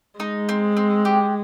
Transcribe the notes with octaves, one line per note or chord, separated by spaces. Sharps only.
G#3 D#4
C4
C4
G4